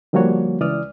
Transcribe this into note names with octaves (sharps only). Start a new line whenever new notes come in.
D3 F3 G3 A#3 F#4 C#5
C#2 E3 D5 D#6 F6